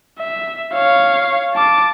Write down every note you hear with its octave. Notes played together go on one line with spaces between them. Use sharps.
E5
C#5 F5
A5 D6